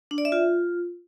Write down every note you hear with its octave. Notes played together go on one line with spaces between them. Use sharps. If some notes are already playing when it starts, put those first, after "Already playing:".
D4
D5
E5
F4